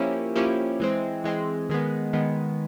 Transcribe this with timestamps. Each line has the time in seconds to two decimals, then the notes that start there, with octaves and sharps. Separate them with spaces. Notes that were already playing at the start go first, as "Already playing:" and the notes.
Already playing: F3 A#3 C#4 E4 G4
0.36 F3 A#3 C#4 E4 G4
0.80 E3 G#3 C4
1.24 E3 G#3 C4
1.69 D#3 G#3 B3
2.13 D#3 G#3 B3